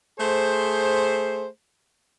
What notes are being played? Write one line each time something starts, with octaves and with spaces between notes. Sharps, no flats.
A3 G#4 C5